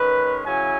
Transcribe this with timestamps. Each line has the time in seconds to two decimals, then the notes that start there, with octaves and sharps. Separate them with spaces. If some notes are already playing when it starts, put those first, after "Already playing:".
Already playing: D#3 G#3 C#4 B4
0.45 C#3 F#3 C#4 E4 G#5